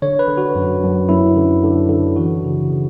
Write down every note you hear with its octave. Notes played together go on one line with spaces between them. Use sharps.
D3 C#5
B4
D3
F#4
F#2
F#2
F#2 E4
D3
D3
D3
E3 F#4
C#3
C#3